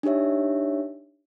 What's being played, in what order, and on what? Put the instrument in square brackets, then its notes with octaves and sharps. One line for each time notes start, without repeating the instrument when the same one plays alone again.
[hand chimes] D4 D#4 G4 C#5 E5